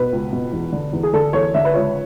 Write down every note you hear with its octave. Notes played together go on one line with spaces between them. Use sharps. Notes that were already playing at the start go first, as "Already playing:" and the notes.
Already playing: B2 B4
C#2
B2
E2
D3
E2
G#4
D3 A4
E2 C#5
D3 E5
B4
C#2 C#5